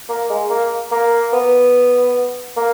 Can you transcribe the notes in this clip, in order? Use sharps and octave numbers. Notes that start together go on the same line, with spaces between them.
A#3
G#3
A#3
A#3
B3
A#3